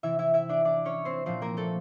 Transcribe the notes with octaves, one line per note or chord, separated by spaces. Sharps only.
C3 E3 E4 E5
E4 E5
E4 E5
D4 D5
D4 D5
C#4 C#5
C4 C5
A#2 F3 C4 C5
A#3 A#4
A3 A4